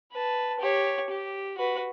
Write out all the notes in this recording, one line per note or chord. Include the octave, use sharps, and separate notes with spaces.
B4 A5
G4 C#5
G4
F#4 B4